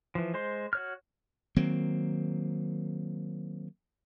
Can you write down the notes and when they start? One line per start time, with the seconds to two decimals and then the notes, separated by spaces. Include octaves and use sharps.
0.15 E3 F3
0.34 G#3 C5 C6
0.73 F#4 C#5 F6
1.56 D#3 F#3 A#3 C4